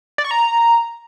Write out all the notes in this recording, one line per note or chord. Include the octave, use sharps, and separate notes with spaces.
D5
C#6
A#5